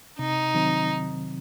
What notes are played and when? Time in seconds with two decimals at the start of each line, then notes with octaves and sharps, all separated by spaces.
0.19 C3 D#4
0.55 D#3 F#3 C4